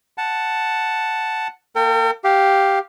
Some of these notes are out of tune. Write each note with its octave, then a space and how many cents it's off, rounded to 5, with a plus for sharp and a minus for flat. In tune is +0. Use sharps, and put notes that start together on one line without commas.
F#5 +0 A5 +0
A#3 +0 A#4 -45 G5 +0
G4 +0 F5 +0